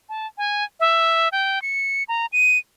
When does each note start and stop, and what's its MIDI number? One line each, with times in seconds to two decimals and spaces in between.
0.09 0.27 81
0.38 0.64 80
0.80 1.29 76
1.32 1.62 79
1.62 2.03 97
2.09 2.26 82
2.33 2.58 99